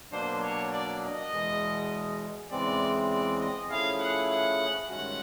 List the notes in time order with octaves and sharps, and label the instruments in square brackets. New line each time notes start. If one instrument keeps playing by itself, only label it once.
[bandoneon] B2 F#3 A#3 D4 [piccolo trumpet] C5
[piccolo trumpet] C#5
D5
D#5
[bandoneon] E2 B2 G#3
[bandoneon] E2 C#3 E3 G#3 C4 [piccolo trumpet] D5
[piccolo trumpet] D5
D#5
[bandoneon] F3 A3 C#4 E4 G#4 [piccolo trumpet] F5
[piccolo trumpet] F#5
F#5
[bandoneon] G2 D#3 G#3 C#4 F#4 [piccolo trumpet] F#5